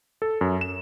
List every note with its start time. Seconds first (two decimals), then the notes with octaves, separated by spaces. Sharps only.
0.22 A4
0.41 F#2
0.61 E7